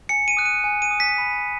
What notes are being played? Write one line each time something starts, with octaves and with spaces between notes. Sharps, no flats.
G#5 C#7
D#7
D#6 F#6
D#7
G#5
D#7
D#6 F#6
B6
B5